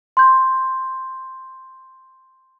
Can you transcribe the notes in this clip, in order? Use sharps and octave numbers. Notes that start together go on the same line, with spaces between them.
C6 G6